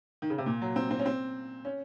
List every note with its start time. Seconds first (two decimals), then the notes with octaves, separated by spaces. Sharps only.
0.22 D#3
0.30 C#3
0.38 C3
0.46 A#2
0.62 F#3
0.76 C4
0.91 C4
0.99 C#4
1.05 C4
1.65 C#4